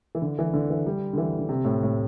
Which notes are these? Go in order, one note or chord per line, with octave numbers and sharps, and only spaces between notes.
E3
D3
E3
D3
E3
G3
D3
E3
D3
C3
A2
A2